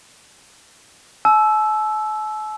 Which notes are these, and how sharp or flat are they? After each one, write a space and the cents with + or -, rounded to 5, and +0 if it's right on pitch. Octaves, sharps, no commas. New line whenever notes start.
A5 -45 E6 +0